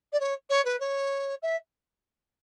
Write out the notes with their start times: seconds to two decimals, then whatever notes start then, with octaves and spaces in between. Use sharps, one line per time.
0.13 D5
0.20 C#5
0.50 C#5
0.65 B4
0.80 C#5
1.42 E5